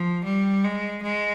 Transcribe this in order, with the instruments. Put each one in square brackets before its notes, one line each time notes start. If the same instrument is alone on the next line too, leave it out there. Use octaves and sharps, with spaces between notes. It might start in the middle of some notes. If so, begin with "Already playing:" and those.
Already playing: [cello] F3
G3
G#3
G#3